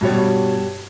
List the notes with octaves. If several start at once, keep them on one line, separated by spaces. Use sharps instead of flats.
G2 B2 G3 C#5